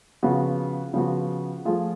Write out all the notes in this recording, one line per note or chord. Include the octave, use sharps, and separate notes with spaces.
C#3 F3 B3 F#4
C#3 F3 B3 F#4
F3 A3 F4 G#4